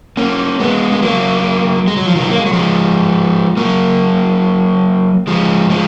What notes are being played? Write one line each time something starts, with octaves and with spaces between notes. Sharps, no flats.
A#3 C#4
G#3 B3
G#3
F#3 A#3
G#3
F#3
F3
D#3 F#3
A#3
G#3
F#3
F3 G#3
F#3 A#3
F3 G#3
F3 G#3